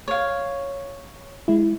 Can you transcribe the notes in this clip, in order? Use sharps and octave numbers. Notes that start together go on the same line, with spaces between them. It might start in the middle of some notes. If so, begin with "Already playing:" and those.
C#5 F5
G#3 E4